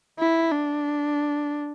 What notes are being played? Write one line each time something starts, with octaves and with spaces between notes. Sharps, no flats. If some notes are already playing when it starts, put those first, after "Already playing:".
E4
D4